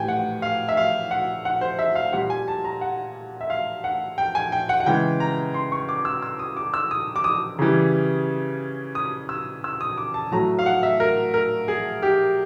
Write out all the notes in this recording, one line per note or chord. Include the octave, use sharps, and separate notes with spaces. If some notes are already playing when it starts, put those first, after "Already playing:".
Already playing: A2 E3 G3 G5 G#5
F#5
F5
E5
F5
F#5
F#5
C5
E5
F5
A#2 G3 F#5
G#5
A5
A#5
F#5
E5
F5
F#5
G5
G#5
G5
F#5
F#5
C#3 E3 G#3 G5
A#5
C6
C#6
D6
E6
E6
D#6
D6
E6
D#6
D6
D#6
C#3 E3 G3
D#6
E6
E6
D#6
D6
A5
A2 F#3 A3 A#5
F5
F#5
E5
A#4
A#4
G#4
G4